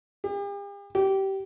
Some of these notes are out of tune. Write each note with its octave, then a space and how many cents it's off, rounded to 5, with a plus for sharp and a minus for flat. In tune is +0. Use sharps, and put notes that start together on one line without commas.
G4 +45
G4 -20